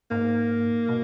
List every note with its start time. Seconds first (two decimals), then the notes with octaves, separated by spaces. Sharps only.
0.11 G#2 A#3
0.89 B2